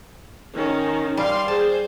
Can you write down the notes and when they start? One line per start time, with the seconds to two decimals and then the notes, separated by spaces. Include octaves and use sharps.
0.54 D#3 C#4
1.17 G3 F5 C6
1.48 G#4 C5 A5